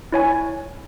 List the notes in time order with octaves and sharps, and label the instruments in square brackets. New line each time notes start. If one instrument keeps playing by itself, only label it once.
[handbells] E4 C#5 G#5